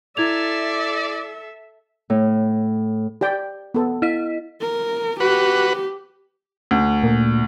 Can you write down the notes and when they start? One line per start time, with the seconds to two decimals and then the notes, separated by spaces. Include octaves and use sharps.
0.17 E4 A4 D5 E5 G#6 F7
2.10 A2
3.21 G4 D5 G5
3.74 B3 A4
4.02 E4 D#5 B6
4.61 A#4
5.20 F#4 G4 B4
6.71 D2
7.03 A#2